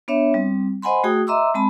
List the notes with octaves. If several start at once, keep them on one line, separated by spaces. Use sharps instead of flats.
B3 D4 C#5 E5
G3 C4
C5 D#5 F#5 G#5 B5 C6
A3 F#4 G#4 G5 D#6
D#5 E5 A#5 C6 D6 E6
G#3 C4 A5 B5